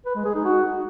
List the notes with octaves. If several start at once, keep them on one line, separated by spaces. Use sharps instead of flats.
B4
G#3
G#4
D#4
F#4